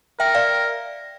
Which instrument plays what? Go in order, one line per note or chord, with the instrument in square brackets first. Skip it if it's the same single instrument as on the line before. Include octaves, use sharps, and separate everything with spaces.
[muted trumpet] A#4 [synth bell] E5 G5
[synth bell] D5 F5